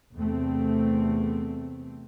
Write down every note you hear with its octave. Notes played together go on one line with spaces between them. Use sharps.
E2 C3 A3 C4